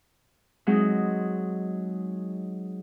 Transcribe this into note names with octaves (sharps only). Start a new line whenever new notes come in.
F#3 G#3 C4 D#4